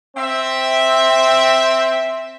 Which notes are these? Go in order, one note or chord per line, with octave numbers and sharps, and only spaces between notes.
C4 E5